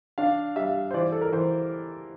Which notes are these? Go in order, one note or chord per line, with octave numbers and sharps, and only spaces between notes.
D4 F5
G3 E5
C5
E3 D5
A4
A#4
E3 C5